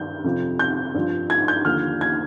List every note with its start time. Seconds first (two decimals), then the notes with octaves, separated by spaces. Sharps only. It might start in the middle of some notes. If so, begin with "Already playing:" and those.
Already playing: G2 D#3 G6
0.24 F2 C3 F3
0.59 G6
0.94 G2 F3
1.30 G#6
1.48 G6
1.65 D#2 D3 F3 F6
2.01 G#6